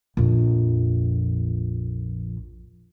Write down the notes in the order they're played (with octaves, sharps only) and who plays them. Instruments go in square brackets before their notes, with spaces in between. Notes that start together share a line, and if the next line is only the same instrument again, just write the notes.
[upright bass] A#1 F2